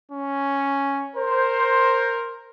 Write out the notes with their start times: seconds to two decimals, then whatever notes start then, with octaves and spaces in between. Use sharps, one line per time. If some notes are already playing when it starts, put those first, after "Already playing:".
0.12 C#4
1.16 A#4 C5